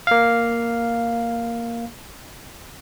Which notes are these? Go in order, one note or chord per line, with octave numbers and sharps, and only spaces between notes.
A#3 F5